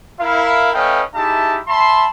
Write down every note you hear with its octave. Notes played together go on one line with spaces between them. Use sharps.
E4 A#4 F5
A3 C#4 B4 D#5 F5 G5
D#4 E4 G4 G#4 E5 A5
E5 A5 B5 C6